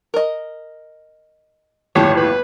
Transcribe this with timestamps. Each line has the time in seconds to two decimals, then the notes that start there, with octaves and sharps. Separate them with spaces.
0.14 A#4 D#5
1.95 G1 D#2 A2 F3 F#4 G4 C#5
2.17 B4